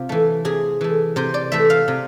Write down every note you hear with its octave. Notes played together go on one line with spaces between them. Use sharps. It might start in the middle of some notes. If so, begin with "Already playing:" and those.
Already playing: C3 F4
E3 A3
C3 G#4
E3 A3
C3 C5
D5
E3 A3 E5
F5
C3